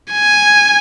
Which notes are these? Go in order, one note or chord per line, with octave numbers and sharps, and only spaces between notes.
G#5